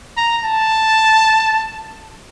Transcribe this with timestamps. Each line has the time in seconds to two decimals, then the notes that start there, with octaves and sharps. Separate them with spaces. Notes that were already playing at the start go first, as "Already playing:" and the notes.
0.17 A#5
0.45 A5